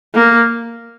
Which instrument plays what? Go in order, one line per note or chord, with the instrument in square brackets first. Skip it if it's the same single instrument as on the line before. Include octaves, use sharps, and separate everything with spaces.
[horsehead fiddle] A#3